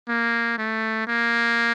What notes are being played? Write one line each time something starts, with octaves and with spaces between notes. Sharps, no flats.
A#3
A3
A#3